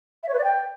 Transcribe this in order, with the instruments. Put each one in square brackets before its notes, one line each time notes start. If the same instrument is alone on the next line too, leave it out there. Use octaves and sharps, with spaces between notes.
[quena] E5
C#5
B4
D5
G5